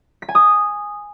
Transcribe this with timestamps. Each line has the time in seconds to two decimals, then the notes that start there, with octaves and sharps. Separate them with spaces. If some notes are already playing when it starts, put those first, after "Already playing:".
0.22 B6
0.29 G#5
0.35 D#6